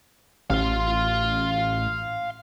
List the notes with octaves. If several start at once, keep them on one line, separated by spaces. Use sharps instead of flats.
A1 F5 C6